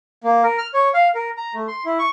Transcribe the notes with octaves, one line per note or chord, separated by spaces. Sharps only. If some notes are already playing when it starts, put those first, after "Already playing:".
A#3
A#4
F6
C#5
F5
A#4
A#5
A3
C6
E4
C#6